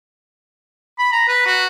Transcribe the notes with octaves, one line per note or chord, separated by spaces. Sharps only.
B5
A#5
B4
F#4